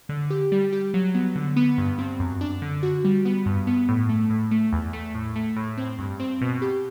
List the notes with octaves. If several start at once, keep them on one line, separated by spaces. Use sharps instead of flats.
D3
G4
G3
G4
F#3
B3
D3
B3
G2
C4
F#2
D4
D3
F#4
G3
B3
G2
B3
A2
A3
A2
A3
E2
A3
A2
A3
A2
C4
G2
C4
B2
G4